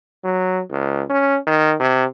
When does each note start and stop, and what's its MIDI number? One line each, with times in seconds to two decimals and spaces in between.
0.24 0.61 54
0.71 1.02 37
1.10 1.36 61
1.47 1.74 51
1.80 2.04 48